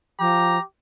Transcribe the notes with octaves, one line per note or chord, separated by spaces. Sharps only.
F3 G4 A#5